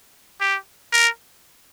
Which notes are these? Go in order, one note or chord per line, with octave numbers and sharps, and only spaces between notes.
G4
A#4